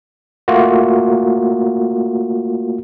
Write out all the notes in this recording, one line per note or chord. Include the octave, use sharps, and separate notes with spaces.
A3 A#3 F4 F#4